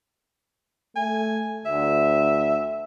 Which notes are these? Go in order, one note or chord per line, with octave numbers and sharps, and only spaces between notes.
A3 G#5
D2 E5